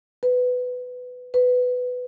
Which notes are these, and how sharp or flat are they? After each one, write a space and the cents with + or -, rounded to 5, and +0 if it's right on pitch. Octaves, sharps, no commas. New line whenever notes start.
B4 +15
B4 +10